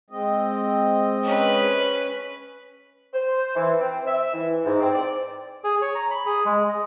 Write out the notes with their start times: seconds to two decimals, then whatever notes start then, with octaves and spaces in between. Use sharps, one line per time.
0.10 G#3 C4 D#5
1.23 C#4 B4
3.13 C5
3.55 E3
3.79 C4
4.06 E5
4.33 E3
4.65 G#2
4.81 C4
4.92 D5
5.64 G#4
5.82 C#5
5.95 A#5
6.11 B5
6.26 G#4
6.45 G#3
6.69 D#5